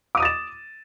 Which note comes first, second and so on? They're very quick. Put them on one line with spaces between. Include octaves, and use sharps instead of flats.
D6 D#7 D#6 A6 E7